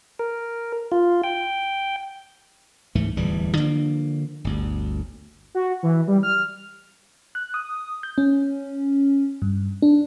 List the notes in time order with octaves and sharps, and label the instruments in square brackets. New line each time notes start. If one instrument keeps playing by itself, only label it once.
[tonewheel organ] A#4
F4
G5
[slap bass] C#2 G#2 E3 A3
D1 E2 E3 G3
D3 F3 A#3
G1 D2
[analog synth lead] F#4
E3
G3
F6
[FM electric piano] F#6
D#6
G6
C#4
G2
D4